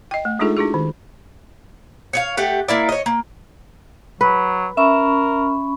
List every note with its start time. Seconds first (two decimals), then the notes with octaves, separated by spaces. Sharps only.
0.11 D#5 G5
0.25 A3
0.39 G#3 D4 D#4 F4 G#4 A4
0.57 D4 E4 F#4 G#4
0.74 D#3
2.13 C#5 D5 F5
2.37 A3 G4 F#5
2.68 A#3 E4 D5
2.89 C#5 D#5
3.06 A#3
4.21 F#3 B4
4.77 C#4 A#4 E5 B5 C#6